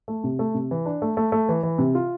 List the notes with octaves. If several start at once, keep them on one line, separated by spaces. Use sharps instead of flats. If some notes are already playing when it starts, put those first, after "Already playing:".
A3
C3
A3
C3
E3
D4
A3
A3
A3
E3
E3
C3
F4